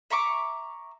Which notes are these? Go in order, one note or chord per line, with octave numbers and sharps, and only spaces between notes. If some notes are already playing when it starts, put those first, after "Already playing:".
E5 A#5 C#6 D6